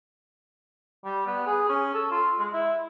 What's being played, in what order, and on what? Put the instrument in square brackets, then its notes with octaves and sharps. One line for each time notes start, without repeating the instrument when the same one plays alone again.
[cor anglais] G3
B3
G#4
C#4
A4
F4
G#3
E4